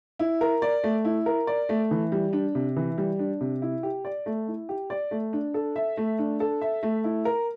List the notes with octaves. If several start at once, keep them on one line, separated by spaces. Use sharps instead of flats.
E4
A#4
D5
A3
E4
A#4
D5
A3
E3
G3
D4
C3
E3
G3
D4
C3
E4
G4
D5
A3
E4
G4
D5
A3
D4
A4
E5
A3
D4
A4
E5
A3
E4
A#4